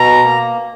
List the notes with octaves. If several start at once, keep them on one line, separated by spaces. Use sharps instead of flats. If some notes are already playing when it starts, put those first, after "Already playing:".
Already playing: B2 A#5
A#3